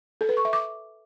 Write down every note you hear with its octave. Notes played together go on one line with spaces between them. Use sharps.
A4
B4
C#6
E5
D6